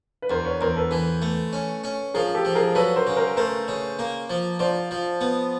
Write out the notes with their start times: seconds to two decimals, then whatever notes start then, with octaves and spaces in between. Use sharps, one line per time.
0.22 B4
0.30 E2 A#4 C5
0.45 B4 C#5
0.61 E2 A#4 C5
0.76 A4 B4
0.91 E3 A4 B4
1.22 A3
1.53 C#4
1.84 C#4
2.14 F3 G#4 A#4
2.34 G4 A4
2.45 F3
2.55 G#4 A#4
2.75 F#3 A4 B4
2.96 A#4 C5
3.07 C#3
3.17 A#4 C5
3.37 A3 A#4 C5
3.68 C#3
3.99 A#3
4.30 F3
4.59 F3 C5 D5
4.91 F3
5.21 B3